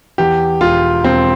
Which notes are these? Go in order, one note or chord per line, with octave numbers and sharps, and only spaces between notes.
E2 G4
E1 F4
E1 C4